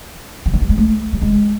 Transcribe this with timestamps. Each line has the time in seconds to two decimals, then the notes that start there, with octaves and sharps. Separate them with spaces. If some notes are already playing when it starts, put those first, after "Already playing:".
0.46 F3
0.54 F#3
0.62 G3
0.69 G#3
0.78 A3
1.13 G3
1.22 G#3